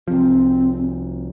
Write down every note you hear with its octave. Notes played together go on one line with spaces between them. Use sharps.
C2 F3 C4